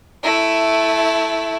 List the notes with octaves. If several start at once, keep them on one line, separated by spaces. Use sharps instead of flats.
A3 E4